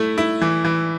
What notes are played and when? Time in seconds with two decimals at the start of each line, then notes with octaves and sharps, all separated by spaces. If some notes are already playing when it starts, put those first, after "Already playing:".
Already playing: A3 E4
0.18 E4
0.41 E3
0.65 E3